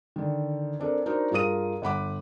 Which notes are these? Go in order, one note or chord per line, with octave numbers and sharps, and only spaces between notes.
D3 D#3
C4 D4 A4 A#4
D4 D#4 F#4 A#4 C5
G2 F4 G#4 A#4 D#6 D#7
G1 F#5 B5 D6